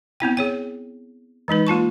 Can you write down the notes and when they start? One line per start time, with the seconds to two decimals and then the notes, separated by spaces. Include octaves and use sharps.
0.20 B3 C4 E4 G5
0.37 G#4 C#5 G5
1.48 E3 G#3 D#4 B4
1.67 A#3 F4 A5 C#6